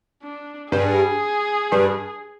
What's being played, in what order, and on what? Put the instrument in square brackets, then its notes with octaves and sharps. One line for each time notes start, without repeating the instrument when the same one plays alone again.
[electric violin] D4
[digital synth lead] G2 [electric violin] G#4
[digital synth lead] G2